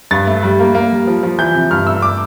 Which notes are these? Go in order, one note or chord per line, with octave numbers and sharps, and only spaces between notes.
G2 A6
A3
G3
A#3
A#3
G3
F3
F3
E3 G6
C3
G2 F6
A3 E6
D6